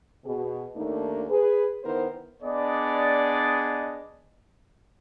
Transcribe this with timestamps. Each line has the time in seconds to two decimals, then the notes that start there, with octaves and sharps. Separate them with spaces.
0.25 B2 G#4
0.76 D#2 A3 A#3 D4 D#4
1.30 G#4 B4
1.84 D#3 B3 E4 A#4 C5
2.42 B3 D4 G#4 D5 D#5